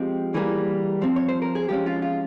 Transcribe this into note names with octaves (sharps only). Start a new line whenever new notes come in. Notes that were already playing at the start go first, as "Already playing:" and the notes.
Already playing: F3 G#3 C4 G4
E3 G3 A#3 G#4
F3 C4
C#5
C5
A#4
G#4
F3 G#3 C#4 G4
F4
F4